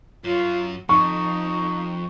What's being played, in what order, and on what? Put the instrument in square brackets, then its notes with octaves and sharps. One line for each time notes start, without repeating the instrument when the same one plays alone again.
[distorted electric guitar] F#2 F#3 [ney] F4
[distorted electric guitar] F2 [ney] D#4 [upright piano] C#6